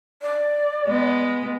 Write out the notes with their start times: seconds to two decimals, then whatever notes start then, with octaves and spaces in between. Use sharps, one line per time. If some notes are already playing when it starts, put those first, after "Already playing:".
0.22 D5
0.87 G#3 B3